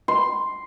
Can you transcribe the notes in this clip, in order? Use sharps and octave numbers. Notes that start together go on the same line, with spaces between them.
C6